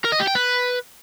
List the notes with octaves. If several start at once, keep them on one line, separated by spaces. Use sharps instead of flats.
A#4
D#5
G4
G5
B4